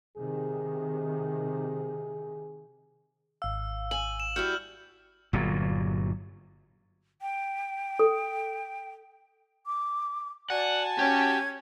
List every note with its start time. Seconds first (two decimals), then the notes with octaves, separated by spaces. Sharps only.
0.17 C3 D#3 G#4
3.42 G#1 F5 E6
3.91 G#5 F#7
4.20 E7
4.36 G3 E4 F#4 F6 G6
5.33 G1 A#2 F#3
7.21 G5
7.99 A4
9.66 D6
10.50 F#4 D5 F#5 G#5 A5
10.99 C#4 G4 G#6